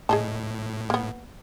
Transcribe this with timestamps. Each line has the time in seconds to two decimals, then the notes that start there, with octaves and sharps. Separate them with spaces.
0.09 A2 G#4 D#5 A5
0.90 A#3 B3